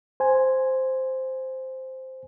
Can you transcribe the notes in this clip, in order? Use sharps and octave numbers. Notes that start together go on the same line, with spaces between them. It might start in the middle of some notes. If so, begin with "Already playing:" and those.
C5 G#5